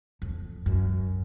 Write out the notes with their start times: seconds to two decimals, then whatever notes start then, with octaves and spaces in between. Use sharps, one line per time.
0.22 F2
0.66 F#2